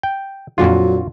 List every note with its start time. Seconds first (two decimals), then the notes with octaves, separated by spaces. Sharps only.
0.03 G5
0.58 F2 A#2 D3 F#3 F4 F#4